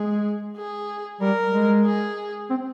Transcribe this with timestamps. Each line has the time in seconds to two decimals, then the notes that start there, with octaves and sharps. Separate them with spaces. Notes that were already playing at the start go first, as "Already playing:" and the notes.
Already playing: G#3 G#4
0.57 G#4
1.21 G3 A#4
1.53 G#3
1.86 G#4
2.50 C4